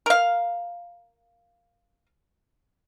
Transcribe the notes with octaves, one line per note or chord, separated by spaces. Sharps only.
A#4 F5